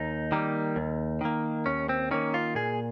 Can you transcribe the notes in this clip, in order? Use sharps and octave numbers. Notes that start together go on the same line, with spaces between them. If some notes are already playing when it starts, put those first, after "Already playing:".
Already playing: D#2 D#4
D#3 G3 A#3
D#2
D#3 A#3
D#2 C#4
C4
D#3 A#3 C#4
F4
A#2 G#4